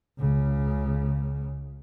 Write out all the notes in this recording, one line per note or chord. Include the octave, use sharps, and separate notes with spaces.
C#2 C#3